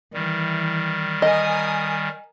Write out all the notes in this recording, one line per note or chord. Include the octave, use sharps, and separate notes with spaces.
D#3 E3 G3
A#4 D#5 G#5 D#6